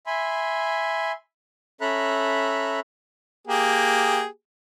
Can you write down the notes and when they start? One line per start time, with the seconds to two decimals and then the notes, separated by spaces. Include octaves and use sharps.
0.07 E5 G#5 B5 C6
1.81 C#4 A4 E5 A#5 B5 F#6
3.47 A#3 G4 G#4